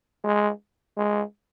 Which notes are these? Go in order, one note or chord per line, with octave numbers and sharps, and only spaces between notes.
G#3
G#3